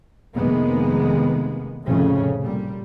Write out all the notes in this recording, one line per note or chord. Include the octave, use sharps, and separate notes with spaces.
F1 C3 D#3 G#3 A#3 B3
F1 F2 A2 C#3 C#4
A#2 G3